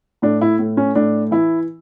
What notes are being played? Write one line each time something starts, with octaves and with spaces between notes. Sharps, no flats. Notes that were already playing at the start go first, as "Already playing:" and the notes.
A2 D4
E4
A2
C#4
A2 D4
E3 E4